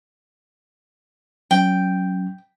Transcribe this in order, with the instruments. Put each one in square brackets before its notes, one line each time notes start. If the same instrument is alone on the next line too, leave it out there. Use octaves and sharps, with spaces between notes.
[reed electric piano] F#3 C#4 [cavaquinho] G5